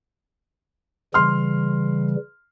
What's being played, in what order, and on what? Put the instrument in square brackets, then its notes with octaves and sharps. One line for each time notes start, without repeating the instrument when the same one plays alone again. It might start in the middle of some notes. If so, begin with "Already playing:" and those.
[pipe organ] C#3 E3 G3 [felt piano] C6 F6